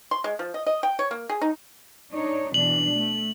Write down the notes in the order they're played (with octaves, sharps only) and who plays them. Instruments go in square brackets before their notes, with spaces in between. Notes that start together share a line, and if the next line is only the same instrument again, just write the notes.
[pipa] C6
G#3
F3
D#5
D#5
G5
C#5
A#3
G#4
D#4
[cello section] D4 D#4 C#5
[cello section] B2 E3 D4 [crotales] F#7
[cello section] A3